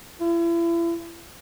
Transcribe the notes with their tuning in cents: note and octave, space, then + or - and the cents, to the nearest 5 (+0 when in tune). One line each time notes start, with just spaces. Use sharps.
E4 +40